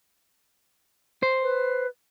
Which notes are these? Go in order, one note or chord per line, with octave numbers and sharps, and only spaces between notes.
C5
B4